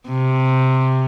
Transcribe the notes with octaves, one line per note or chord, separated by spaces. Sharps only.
C3